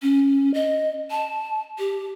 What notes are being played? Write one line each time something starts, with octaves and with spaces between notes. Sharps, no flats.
C#4
D#5
A5
G4